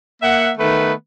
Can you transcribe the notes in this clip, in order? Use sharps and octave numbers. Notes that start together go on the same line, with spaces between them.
A#3 E5 F#5
D#3 A3 B3 B4